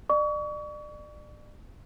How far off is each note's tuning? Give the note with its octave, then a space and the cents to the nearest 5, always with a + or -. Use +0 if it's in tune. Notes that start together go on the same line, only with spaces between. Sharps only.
D5 +35 C#6 +35